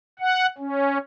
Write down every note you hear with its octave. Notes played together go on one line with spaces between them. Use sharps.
F#5
C#4